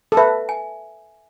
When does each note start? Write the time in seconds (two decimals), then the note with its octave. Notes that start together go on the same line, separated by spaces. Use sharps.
0.12 A4
0.17 B4 E5
0.49 G#5